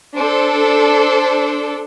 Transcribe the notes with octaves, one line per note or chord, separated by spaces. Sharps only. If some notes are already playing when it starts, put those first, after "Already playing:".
D4 A4 C5
C5